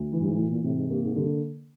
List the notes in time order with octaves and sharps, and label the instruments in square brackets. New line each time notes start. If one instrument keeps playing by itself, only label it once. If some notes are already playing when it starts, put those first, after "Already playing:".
Already playing: [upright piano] D2
E3
[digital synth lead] G2
G#2
[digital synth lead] A2 [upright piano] E3
[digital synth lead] A#2
[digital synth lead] A2 [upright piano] C3
[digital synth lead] G#2
[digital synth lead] G2 [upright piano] A#3
[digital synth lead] G#2
[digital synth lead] G2 [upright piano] D3